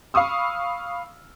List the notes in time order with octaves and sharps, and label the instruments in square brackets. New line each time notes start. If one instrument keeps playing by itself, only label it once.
[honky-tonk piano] F5 B5 C#6 D#6 E6